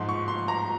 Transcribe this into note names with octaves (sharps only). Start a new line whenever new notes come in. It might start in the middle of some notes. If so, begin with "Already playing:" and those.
Already playing: G#2 F3 C6
C#6
C6
A#5